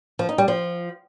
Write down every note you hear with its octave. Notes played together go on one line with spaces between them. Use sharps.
F3
D#4
G3
F3